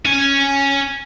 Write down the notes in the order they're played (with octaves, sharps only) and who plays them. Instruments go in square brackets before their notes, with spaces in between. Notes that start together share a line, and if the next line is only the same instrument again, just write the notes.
[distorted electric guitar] C#4 G#5